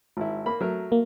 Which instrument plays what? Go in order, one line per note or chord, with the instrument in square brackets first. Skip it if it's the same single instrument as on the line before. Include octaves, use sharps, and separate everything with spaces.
[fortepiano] G#1 E4
A#3 B5
F#3 A3 A#4
[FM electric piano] A#3